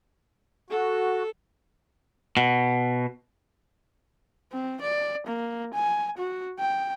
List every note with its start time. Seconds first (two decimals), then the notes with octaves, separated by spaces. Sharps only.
0.70 F#4 A4
2.37 B2
4.52 C4
4.81 D5
5.27 A#3
5.74 G#5
6.18 F#4
6.59 G5